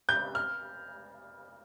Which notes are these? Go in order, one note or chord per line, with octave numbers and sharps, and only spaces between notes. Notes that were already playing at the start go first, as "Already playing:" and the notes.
G6
F6